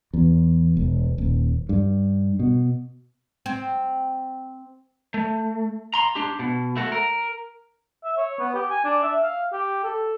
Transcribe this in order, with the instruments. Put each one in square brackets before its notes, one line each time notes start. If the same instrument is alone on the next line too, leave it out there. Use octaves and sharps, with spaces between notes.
[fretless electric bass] E2
E1
D#1
G2
B2
[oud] C4
[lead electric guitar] A3
A#5 C6
D4 G4
B2
A3 F#4
A#4
[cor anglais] E5
C#5
B3
G4
G#5
D4
E5
F5
G4
A4